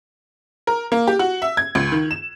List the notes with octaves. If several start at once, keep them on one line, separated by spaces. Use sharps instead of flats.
A#4
A#3
G4
F#4
E5
G#6
C#2
D#3
E7